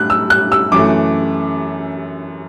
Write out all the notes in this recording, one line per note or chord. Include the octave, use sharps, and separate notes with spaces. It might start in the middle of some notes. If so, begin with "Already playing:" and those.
Already playing: A2 F#6
E6
F#6
E6
F#2 E3 A3 D6